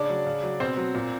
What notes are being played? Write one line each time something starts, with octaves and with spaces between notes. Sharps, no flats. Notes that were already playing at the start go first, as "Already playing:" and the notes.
Already playing: C#3 D4 D5
F#3
C#3
F#3
B2 C4 C5
F#3
A#2